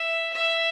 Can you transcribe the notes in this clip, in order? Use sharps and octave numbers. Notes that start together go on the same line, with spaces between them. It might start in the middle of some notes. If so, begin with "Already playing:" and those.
Already playing: E5
E5